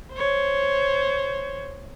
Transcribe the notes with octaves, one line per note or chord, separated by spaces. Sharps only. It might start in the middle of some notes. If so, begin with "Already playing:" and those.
C5 C#5